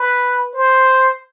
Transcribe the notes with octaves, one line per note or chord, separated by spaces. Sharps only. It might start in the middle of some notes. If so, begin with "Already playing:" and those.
Already playing: B4
C5